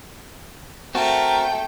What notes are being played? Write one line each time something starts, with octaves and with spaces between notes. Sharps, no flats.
A3 C4 F#4 A#4 G5 A5